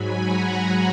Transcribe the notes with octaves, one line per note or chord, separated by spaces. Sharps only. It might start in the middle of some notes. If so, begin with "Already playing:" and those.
Already playing: G#2 F#3 G#5 B5
F#5 A#5